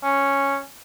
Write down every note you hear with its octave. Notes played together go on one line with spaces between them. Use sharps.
C#4